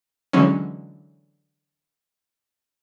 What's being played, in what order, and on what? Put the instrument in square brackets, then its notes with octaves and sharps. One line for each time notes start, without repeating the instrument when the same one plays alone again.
[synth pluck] D3 E3 F#3 G#3 C#4